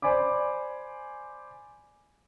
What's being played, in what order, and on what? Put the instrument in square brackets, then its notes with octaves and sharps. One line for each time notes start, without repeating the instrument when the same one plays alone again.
[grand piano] C5 D5 G#5 B5 D6